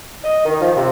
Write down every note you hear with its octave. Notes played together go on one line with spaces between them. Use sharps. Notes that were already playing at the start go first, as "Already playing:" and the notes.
D#5
D#3
F3
C3